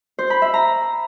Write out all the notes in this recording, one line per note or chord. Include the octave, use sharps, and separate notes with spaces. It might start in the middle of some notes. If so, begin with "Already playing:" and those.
C5
B5
E5
A#5